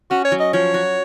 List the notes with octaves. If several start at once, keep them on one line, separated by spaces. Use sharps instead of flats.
C#4 F#4
C#5
F#3
D#5
F3 C#5
F#4